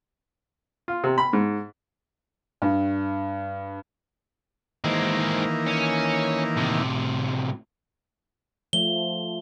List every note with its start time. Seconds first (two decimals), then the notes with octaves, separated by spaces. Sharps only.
0.88 F4
1.04 C3
1.18 B5
1.33 G#2
2.62 G2
4.84 D#3 E3 G#3 A#3 C4
5.67 C#4
6.57 A2 C3
8.73 F3 A3 G7